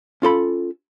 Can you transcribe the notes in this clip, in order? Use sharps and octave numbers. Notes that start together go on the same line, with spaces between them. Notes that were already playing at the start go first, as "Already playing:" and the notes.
C#4 F4 A4 B5